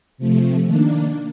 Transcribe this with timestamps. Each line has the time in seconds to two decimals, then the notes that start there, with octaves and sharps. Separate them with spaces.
0.18 C3 F3 A3
0.66 D#3 A#3 D4